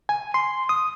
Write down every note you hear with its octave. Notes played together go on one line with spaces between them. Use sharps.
G#5
C6
D#6